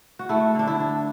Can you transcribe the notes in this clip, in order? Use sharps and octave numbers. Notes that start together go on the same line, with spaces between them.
F#4
A3 E4
D3 D4
E4
D4